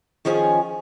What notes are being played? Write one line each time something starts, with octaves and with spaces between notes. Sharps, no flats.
D#3 F3 C#4 G#4 G#5